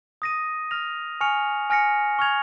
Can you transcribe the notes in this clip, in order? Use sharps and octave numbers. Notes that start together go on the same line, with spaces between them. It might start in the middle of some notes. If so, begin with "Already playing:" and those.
D#6 A#6 D#7
F6 A#6 F7
G#5 C#6 F6 C#7 F7
G#5 F6 A#6 C#7
C#6 F6 G#6 F7